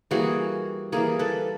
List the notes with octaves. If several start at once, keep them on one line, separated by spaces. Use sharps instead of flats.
E3 G3 A#3 F#4 G#4
E3 G3 A#3 G#4 A#4
A4 B4